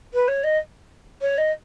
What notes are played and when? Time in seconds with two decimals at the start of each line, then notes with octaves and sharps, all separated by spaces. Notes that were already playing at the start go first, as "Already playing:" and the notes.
0.13 B4
0.28 C#5
0.44 D#5
1.21 C#5
1.38 D#5